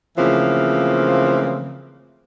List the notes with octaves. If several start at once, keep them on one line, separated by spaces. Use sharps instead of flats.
C#3 E3 F3 A3 A#3 C4